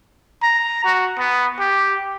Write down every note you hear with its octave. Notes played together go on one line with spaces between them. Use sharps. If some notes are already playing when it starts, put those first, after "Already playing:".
A#5
F#4
B3
G4